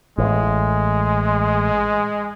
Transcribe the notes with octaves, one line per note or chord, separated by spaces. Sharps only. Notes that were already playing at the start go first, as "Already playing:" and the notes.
A1 G#3